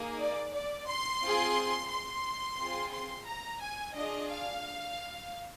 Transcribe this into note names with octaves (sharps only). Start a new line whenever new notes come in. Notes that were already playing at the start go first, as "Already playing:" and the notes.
Already playing: A#3 D#4 G#4
D5
D5
C6
C4 F4 G#4
C6
C4 F4 G#4
C6
A#5
G#5
D4 F4 G#4 D#5
F5